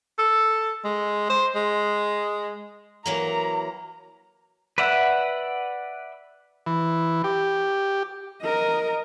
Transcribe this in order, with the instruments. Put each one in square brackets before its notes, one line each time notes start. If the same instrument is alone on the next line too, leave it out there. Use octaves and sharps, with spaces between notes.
[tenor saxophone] A4
G#3
C5
G#3
[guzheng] E3 F#3 A#3 [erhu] A#5
[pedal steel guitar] B4 D5 E5 F#5
[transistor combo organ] E3
G4
[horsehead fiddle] A#4 D#5